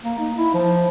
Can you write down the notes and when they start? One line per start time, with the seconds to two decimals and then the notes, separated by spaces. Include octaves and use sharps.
0.03 A#3
0.19 D#4
0.37 E4
0.54 F3